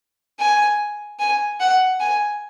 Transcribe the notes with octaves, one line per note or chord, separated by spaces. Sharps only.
G#5
G#5
F#5
G#5